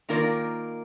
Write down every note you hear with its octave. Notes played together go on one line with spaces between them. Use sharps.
D#3 A#3 F4 A#4 D5